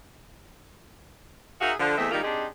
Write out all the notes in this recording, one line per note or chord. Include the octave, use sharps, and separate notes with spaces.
D#4 F#4 G#4 A#4 E5 F5
D3 F3
E2 A3 C4 D#5 E5
D#3 G3 G#3 A#3 D#4 F4
C4 D4 D#4 G4 G#4